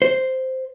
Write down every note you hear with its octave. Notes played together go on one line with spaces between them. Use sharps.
C5